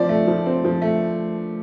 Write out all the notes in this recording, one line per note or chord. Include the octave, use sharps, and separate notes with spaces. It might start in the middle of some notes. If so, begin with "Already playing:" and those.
Already playing: F3 C4 D5
A3
F3
C4
F3
A3